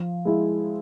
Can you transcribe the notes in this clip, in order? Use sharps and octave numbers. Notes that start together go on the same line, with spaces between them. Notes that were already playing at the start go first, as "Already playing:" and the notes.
Already playing: F3
G#3 E4